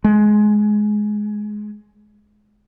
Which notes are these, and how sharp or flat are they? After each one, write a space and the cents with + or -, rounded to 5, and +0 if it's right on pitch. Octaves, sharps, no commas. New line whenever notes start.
G#3 +15